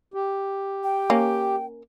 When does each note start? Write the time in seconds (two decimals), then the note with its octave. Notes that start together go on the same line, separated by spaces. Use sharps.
0.14 G4
0.83 G5
1.10 A#3 C#4